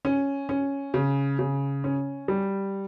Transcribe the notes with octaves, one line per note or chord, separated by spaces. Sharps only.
C#4
C#4
C#3
C#3
C#4
G3